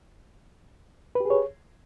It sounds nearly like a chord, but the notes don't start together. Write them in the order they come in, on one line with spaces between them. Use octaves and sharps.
B4 G4 G#4 C#5